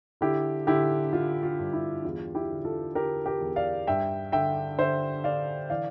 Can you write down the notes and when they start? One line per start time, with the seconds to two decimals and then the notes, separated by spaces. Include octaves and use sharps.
0.21 D3 E4 G4
0.67 D3 E4 G4
1.13 D3 F4
1.43 F4
1.59 G2
1.73 E4
2.05 E2 F4
2.35 E4 G4
2.50 D3
2.65 F4 A4
2.95 D3 G4 A#4
3.26 G4 A#4
3.41 E2
3.56 D5 F5
3.87 G2 E5 G5
4.32 D3 E5 G5
4.79 D3 C5 E5
5.24 D3 D5 F5
5.70 E3 D5 F5